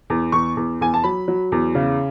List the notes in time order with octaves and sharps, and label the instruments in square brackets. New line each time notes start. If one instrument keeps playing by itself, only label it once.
[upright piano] E2
E2 C#6
E2
E2 G#5
A5
F#3 B5
F#3
E2
C#3